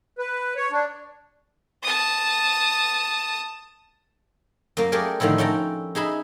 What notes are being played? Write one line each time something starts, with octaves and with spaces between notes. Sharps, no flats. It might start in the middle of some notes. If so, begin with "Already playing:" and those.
B4
C#5
D4
A5 D#6
F#2 A#3
A3 G4 G#4 A#4 D5 G#5
A2 D3 D#3 F3 E4
C#4 A4 G5 A#5
D#4 G#4 E5 B5